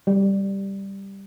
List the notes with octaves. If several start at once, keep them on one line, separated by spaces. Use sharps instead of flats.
G3